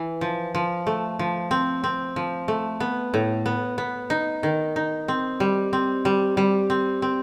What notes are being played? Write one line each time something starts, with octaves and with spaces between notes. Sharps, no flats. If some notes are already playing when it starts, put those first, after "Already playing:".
Already playing: E3
F3
F3
A3
F3
C4
C4
F3
A3
B3
A2
B3
B3
D#4
D#3
D#4
C4
G3
C4
G3
G3
C4
C4